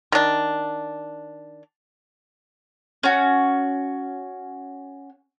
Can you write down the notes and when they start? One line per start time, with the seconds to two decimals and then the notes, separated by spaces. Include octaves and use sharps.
0.12 D#3 D4
3.03 C#4 F#4